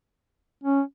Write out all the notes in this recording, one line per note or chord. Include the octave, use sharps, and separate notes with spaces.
C#4